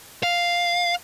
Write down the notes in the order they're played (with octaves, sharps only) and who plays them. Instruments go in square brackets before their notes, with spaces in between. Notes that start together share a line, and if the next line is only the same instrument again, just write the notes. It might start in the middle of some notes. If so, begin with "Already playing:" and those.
[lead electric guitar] F5